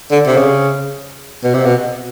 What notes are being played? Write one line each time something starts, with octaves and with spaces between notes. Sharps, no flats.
D3
C3
C#3
B2
C3
B2